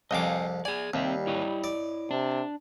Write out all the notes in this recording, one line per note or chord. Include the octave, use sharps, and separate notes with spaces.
C2 F2 D#5 F5 G#5 D6
G#4 D5 G#5
D#2 G3 C4 E5
E4 C#5 D#5
D5
C3 D4